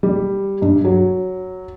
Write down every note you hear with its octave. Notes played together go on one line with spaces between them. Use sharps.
G3
G2
F#3